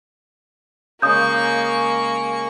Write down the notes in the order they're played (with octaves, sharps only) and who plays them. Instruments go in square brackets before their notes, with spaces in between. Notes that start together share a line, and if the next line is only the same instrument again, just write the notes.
[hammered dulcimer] C#3 G#3 [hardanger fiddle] A#3 C#6 [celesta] D#6 G6